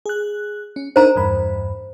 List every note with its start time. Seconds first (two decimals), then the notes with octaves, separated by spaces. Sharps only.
0.06 G#4 F#6
0.76 C#4
0.96 D4 D#4 A#4 C5 A#5
1.16 E2 G2 B5